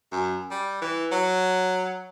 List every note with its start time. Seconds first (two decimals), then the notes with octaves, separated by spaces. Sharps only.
0.12 F#2
0.51 G3
0.82 E3
1.12 F#3